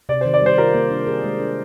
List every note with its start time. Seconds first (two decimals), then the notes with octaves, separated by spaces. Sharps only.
0.09 C3 D5
0.21 D#3 C5
0.34 D5
0.42 G3 C5
0.58 F4 A#4
0.74 A#3
0.91 D4
1.07 G#4
1.24 G#3
1.40 D4